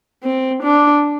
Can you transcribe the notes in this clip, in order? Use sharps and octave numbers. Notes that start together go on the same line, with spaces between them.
C4
D4